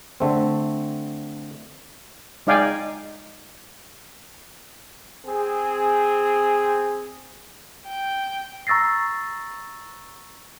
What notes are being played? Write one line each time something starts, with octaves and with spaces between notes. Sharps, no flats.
D3 A3 C4
G#3 D#4 D5 F5 G5 G#5
C4 G#4
G5
A#5 C#6 E6 A6 A#6 C7